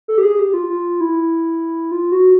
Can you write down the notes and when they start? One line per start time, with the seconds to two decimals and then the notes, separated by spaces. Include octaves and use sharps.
0.08 A4
0.18 G4
0.23 G#4
0.39 G4
0.54 F4
0.70 F4
1.01 E4
1.91 F4
2.12 F#4